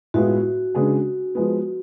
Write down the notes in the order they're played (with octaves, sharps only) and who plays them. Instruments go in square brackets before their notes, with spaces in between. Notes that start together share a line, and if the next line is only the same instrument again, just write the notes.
[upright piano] A2 G#3 B3 F4 [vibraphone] F#4
[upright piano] C#3 G#3 D4 G#4 B4
F3 G#3 B3